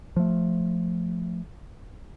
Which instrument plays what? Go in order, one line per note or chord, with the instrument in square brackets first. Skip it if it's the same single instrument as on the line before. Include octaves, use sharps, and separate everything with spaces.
[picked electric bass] F3 A3